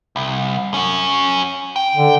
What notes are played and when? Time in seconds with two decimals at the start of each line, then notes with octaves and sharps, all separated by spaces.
0.16 C2
0.74 C#4 F#4
1.76 G5
1.95 D3